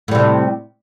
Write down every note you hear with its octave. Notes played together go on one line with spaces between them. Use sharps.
A2 C3 G3